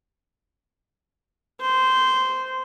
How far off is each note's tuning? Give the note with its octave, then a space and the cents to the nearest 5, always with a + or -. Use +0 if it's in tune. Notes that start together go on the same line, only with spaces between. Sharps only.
C5 -10